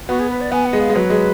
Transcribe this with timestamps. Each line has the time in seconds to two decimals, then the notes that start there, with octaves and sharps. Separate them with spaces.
0.08 B3 F#4
0.19 G#4
0.30 B4
0.41 D5
0.52 B3 G#5
0.65 F#5
0.73 G#3
0.80 F5
0.89 G#3
0.95 F#3 B4
1.10 G#3